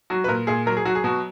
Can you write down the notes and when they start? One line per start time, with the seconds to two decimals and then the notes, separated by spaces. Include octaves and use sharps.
0.10 F#3 F#4
0.24 B4
0.28 A#2 A#4
0.47 A#2 G#4
0.66 F#3 A#4
0.77 G#4
0.85 F#3 F#4
0.95 G#4
1.04 B2 F#4